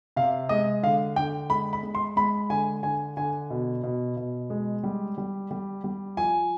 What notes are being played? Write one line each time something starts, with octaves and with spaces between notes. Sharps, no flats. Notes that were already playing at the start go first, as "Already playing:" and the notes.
C3 F5
G#3 D#5
D3 F5
D3 G5
G#3 B5
B5
G#3
C6
G#3 B5
D3 G#5
D3 G#5
D3 G#5
B2
B2
B2
G#3
G3
G3
G3
G3
F3 G#5